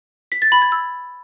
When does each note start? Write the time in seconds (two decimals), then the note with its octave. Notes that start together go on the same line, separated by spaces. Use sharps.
0.32 B6
0.42 A6
0.52 B5
0.62 G#6
0.72 E6